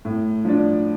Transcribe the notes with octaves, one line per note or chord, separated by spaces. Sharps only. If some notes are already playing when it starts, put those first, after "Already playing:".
A2
F3 D4